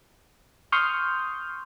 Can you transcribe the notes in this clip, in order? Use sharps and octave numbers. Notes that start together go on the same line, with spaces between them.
C6 C#6 D#6 F6 G6